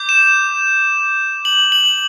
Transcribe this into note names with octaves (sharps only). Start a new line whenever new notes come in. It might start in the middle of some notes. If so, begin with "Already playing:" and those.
Already playing: D6 G6
E7
F#7
F#7